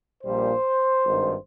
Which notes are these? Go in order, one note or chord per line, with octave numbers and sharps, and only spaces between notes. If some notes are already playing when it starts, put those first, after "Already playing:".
A#1 A#2 G3 C5
G#1 G2 D#3